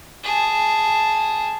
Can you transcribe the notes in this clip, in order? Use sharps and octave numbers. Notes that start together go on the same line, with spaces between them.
G#4 A5